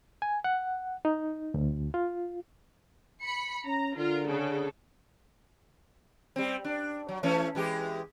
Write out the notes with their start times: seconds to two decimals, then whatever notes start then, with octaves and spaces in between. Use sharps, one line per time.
0.22 G#5
0.44 F#5
1.05 D#4
1.54 D2
1.94 F4
3.22 B5 C#7
3.65 C#4 A#5
3.97 D3 F4 A#4
4.28 C#3 A4
6.36 G3 C4
6.65 D4
7.09 F#3
7.23 E3 A3 C#4
7.55 E3 G#3 G4